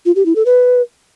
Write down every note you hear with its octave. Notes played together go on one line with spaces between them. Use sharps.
F4
G4
E4
A4
B4